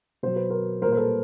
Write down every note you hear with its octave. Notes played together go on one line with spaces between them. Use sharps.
B2 F#3 C5
B4
A#4 C5
A#2 G3 A#4 C5
C5
A4 B4